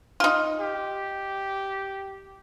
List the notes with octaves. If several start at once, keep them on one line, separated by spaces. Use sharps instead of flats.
D#4 F4
G4